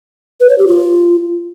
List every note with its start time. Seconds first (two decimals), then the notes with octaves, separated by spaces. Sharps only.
0.40 B4
0.49 C#5
0.58 G4
0.67 F4